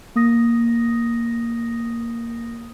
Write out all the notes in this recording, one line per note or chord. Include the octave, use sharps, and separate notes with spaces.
A#3 D#6 A#6